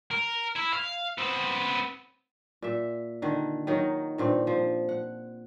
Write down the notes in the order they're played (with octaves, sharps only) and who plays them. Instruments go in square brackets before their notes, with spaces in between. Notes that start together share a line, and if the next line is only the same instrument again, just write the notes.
[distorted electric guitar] A#4
E4
F5
B3 C4
[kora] A#2 E5
D3 D#3
D#3 F#3 D#4
G2 A#2 C4
F3
F#5